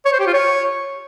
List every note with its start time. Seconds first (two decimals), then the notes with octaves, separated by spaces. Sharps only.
0.05 C#5
0.13 C5
0.20 G4
0.27 F4
0.34 C#5